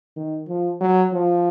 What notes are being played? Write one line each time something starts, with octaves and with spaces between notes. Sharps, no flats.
D#3
F3
F#3
F3